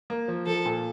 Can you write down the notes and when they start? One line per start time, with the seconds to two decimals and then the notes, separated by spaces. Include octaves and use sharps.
0.10 A#3
0.28 F3
0.47 F3 A4
0.65 A#2